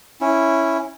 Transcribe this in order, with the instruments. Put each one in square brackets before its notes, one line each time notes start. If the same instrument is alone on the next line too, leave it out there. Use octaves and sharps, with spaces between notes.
[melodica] C#4 E4